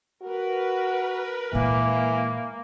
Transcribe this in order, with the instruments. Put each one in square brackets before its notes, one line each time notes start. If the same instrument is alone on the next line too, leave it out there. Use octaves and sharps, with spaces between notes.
[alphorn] F#4 [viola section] A#4 B4
[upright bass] A#2 G#3 [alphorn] E3 [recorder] A#3